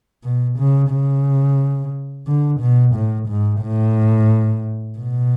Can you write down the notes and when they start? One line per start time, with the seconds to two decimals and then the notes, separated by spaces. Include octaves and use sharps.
0.23 B2
0.58 C#3
0.91 C#3
2.27 D3
2.61 B2
2.95 A2
3.29 G#2
3.62 A2
4.98 B2